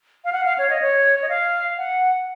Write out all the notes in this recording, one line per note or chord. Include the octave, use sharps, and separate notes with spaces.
F5
F#5
F5
C#5
D#5
C#5
D#5
F5
F#5